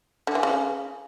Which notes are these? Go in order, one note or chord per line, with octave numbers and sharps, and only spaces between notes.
D3
E3
C#3